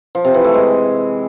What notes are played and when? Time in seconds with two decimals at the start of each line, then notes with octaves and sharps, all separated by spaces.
0.15 F3
0.25 C3
0.34 E3
0.44 A3
0.54 G#3